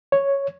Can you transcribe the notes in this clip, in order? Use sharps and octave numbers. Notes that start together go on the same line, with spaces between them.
C#5